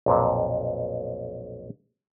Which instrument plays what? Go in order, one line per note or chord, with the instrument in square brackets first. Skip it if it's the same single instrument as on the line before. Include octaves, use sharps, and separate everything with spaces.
[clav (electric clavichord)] B1 F2 A#2